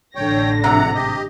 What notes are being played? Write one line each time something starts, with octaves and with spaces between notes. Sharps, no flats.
A1 D3 C#5 G5 A#6
F2 G#2 C3 F#5 A#5
G4 D#5